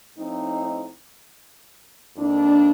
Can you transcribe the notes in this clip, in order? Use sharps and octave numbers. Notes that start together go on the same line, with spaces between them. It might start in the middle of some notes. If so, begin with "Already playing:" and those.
A2 F3 C4 D#4
F2 D#3 A#3 D4